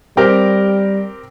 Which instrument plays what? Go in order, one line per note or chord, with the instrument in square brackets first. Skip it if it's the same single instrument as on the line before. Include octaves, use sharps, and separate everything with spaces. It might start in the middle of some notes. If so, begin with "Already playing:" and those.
[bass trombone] G3 [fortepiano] C4 G4 A#4